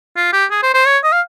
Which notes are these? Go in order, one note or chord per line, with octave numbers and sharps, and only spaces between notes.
F4
G4
G#4
C5
C5
C#5
D#5
F5